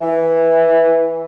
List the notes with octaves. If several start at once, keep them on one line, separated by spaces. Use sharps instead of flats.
E3